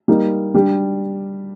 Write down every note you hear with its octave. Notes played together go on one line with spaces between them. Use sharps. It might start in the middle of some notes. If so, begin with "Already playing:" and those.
G3 A#3 D#4
G3 D4 G4